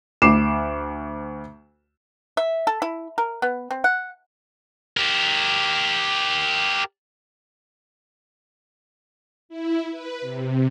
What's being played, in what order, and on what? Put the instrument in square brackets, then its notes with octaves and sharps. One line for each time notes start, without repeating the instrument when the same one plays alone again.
[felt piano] D2 D6 C7 E7
[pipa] E5
A4
E4
A#4
B3
C4
F#5
[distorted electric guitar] G4 A#4
[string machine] E4
B4
C3